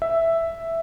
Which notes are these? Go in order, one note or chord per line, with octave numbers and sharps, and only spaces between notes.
E5